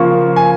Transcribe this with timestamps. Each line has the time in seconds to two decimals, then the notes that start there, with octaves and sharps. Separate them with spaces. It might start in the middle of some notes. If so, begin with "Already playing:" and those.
Already playing: C#3 F3 A#3 F4 C#6
0.36 G#5